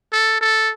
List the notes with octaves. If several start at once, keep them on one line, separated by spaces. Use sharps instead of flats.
A4
A4